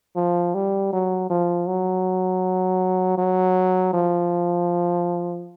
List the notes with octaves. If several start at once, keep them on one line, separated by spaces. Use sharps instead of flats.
F3
G3
F#3
F3
F#3
F#3
F3